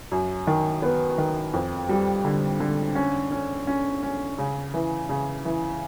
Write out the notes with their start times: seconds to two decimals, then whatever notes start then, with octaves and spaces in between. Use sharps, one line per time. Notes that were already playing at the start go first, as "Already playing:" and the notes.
0.12 F#2
0.47 D#3
0.82 B3
1.18 D#3
1.53 F2
1.89 G3
2.24 D3
2.60 D3
2.95 C#4
3.31 C#4
3.67 C#4
4.03 C#4
4.38 C#3
4.74 E3
5.09 C#3
5.45 E3